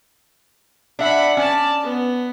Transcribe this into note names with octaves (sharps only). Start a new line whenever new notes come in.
D4 E5 F#5 B5
C#4 D5 A5
B3